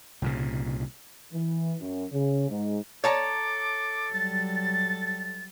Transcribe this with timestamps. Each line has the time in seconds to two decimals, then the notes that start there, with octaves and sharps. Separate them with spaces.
0.22 C2 A#2 C#3
1.33 E3
1.80 F#2
2.12 C#3
2.50 G#2
3.04 A4 C#5 A5 A#5 D6
4.13 F#3 G3 A6